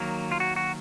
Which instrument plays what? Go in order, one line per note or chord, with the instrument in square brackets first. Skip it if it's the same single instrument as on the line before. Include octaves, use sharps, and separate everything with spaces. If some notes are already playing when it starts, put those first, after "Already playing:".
Already playing: [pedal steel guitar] D#3 F#3 A#3
F4
F#4
F#4